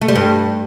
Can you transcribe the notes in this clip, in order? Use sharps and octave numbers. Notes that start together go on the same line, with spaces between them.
A3
G3
G2